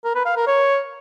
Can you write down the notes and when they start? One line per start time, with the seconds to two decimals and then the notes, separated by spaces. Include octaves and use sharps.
0.04 A#4
0.15 B4
0.26 F5
0.36 A#4
0.47 C#5